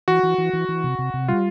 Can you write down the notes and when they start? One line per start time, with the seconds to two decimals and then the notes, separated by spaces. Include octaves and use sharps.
0.08 E3 F#4
0.23 E3
0.38 E3
0.53 E3
0.69 E3
0.84 C3
0.99 C3
1.14 C3
1.28 G3 F4